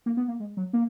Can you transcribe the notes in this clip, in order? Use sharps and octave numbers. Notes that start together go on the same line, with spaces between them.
A#3
B3
A#3
G#3
F#3
A#3